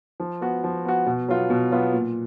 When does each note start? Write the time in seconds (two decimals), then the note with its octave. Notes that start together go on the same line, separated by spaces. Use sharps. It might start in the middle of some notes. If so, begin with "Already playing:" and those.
0.20 F3
0.41 B3 F#4
0.64 F3
0.85 B3 F#4
1.06 B2
1.28 F#3 B3 F4
1.50 B2
1.71 F#3 B3 F4
1.93 A#2